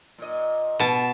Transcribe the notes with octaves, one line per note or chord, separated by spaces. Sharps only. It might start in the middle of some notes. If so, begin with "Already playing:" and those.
A#2 D#5
B2 A5